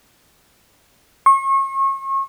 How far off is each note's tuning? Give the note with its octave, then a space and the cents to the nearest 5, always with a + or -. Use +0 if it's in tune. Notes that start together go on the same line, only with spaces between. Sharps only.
C#6 -35